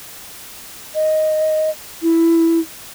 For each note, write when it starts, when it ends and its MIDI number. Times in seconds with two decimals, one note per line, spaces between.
0.95 1.70 75
2.03 2.59 64